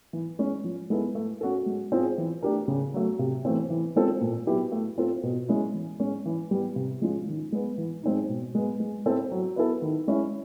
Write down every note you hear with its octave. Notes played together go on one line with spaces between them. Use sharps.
E3
G#3 C#4
F3
G#3 B3 E4 A4
A3
C#4 F#4 A4
G#3
C4 F4 G#4
E3
A3 D4 G4 A#4
C#3
F#3 A3
C3
E3 A3 C4
E3
G#3 C4 F4 A4
A#2
F#3 B3 E4 G4
A3
C4 F4 A4
B2
G#3 C#4 E4
E3
G#3 C#4
E3
G3 B3
C3
F3 G#3 C#4 F4
D#3
G#3 B3
E3
G#3 C4 D#4
B2
G#3 B3
G#3
C4 E4 A4
F#3
B3 E4 A4
D#3
G#3 C#4 E4